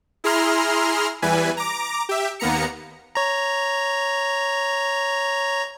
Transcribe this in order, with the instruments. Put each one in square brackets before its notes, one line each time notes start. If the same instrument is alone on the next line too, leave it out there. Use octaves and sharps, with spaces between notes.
[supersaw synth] E4 G#4 A#5 C6 F6
E2 E3 G3 B4 G#5
A#5 D6
G4 E5
D#2 A#3 B3 A#5 C#7
[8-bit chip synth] C#5 A#5